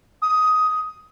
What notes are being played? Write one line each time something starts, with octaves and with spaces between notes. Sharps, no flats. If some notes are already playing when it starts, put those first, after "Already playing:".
D#6